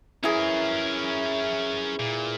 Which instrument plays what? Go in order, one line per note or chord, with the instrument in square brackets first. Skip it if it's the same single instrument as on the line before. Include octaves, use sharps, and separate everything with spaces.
[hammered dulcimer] E3 G#4 [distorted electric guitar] C#4 A#4
[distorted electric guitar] A#2